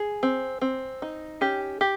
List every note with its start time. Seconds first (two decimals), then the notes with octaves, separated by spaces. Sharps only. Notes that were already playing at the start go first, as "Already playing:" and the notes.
Already playing: G#4
0.23 C4
0.61 C4
1.02 D#4
1.41 C#4 G4
1.81 G4